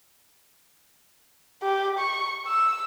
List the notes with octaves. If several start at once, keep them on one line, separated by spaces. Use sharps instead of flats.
G4
C#6
E6